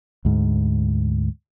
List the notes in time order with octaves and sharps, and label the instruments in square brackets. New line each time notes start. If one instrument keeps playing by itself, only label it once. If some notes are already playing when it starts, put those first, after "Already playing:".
[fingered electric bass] D2 G#2